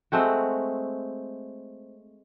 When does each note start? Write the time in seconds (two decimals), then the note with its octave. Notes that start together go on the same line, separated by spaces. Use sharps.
0.12 G#3 A3 C4 F#4